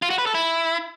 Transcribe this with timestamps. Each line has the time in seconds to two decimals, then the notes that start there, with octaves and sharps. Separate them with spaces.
0.02 F4
0.10 F#4
0.18 B4
0.26 A4
0.34 E4